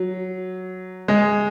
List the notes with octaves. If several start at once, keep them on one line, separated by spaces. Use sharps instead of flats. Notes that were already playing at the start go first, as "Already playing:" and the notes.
Already playing: F#3
G#3